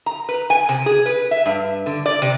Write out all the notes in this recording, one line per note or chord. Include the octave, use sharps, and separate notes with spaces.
A#5
B4
G#5
C3
G#4
B4
E5
G2
D3
D5
C3